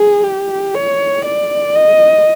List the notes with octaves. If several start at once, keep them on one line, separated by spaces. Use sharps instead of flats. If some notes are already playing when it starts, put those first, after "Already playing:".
Already playing: G#4
G4
C#5
D5
D#5